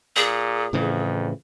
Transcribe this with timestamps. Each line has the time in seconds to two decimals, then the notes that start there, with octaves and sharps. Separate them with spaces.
0.16 A#2 G#4
0.73 F2 A2 C#3 E3